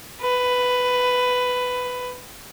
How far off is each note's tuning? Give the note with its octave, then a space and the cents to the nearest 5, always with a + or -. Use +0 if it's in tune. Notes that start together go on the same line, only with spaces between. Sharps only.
B4 +10